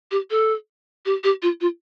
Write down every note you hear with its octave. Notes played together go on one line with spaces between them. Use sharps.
G4
A4
G4
G4
F4
F4